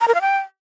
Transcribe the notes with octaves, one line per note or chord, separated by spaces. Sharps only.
A#5
A#4
F5
G5